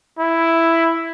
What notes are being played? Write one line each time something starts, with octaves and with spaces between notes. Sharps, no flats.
E4